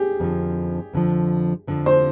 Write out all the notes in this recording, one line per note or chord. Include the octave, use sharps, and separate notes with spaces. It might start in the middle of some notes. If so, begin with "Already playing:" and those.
Already playing: G4 G#4
F2 D3 F3
F2 D3 F3
F2 D3 F3
C5